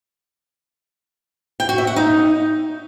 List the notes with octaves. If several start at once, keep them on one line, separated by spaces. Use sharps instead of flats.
G5
F#4
E5
F#5
D#4